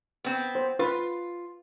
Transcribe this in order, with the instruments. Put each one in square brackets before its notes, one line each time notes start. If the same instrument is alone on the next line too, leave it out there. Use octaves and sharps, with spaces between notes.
[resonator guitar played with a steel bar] B3 C4
[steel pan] C5
[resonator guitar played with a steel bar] F4 [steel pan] B4